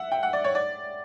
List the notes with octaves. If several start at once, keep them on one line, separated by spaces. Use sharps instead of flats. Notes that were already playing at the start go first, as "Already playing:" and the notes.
Already playing: E5 F#5
G5
F#5
D5
C#5
D5